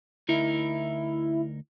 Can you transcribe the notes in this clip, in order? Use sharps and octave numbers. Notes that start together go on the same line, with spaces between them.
D2 D#4 E4 A#4